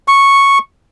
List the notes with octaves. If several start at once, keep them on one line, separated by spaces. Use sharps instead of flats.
C#6